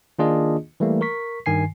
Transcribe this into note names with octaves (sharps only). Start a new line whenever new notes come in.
D#3 A#3 D4 F4 G#4 D#5
E3 G3 A3 A#3
A#4 C#6 B6
G2 D#3 G#5 C7